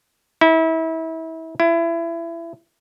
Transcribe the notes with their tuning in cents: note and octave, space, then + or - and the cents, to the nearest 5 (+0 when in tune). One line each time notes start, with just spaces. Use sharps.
E4 -30
E4 +25